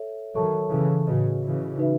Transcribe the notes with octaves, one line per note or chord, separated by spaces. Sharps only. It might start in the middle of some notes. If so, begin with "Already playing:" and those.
Already playing: A4 C#5 E5
D#3 F#3 A4 C#5 E5 A5 C#6
C#3 E3
A2 C#3 F#4 B4 D#5
C#3 E3
D#4 F#4 B4 E5